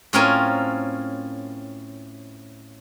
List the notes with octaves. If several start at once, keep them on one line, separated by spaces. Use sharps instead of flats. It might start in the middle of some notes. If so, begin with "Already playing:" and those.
A2 C4 C#4 F4 A#4 G#5